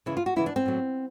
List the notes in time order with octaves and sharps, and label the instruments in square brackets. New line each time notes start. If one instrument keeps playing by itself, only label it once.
[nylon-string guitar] C#3 E3 E4
F4
F#4
C#3 E3 E4
D4
C4
A2 F#3